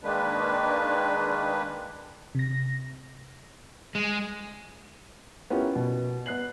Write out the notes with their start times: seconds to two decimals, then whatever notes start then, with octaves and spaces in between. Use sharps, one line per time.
0.03 D#3 G#3 A#3 D4 B4
2.35 C3 A#6
3.95 G#3
5.50 B3 C#4 E4 F4 G4 A#4
5.75 B2
6.26 B3 F#6 C7 F#7